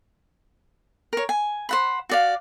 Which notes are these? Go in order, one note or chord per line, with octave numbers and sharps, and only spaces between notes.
A#4 C#5
G#5
C5 F#5 B5
F#4 D5 F5